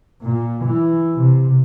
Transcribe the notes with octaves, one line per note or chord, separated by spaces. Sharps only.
A#2
E3
C3